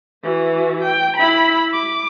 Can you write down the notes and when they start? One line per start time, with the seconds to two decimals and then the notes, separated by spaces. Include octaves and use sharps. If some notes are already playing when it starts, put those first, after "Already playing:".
0.23 E3 F#4
0.83 G5
1.17 E4 B5
1.73 D6